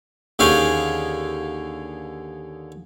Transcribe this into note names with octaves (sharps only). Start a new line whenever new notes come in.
D#2 D3 C#4 G#4 F5 G5